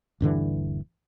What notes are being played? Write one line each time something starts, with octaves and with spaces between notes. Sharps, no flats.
D#1 G2 D3 E3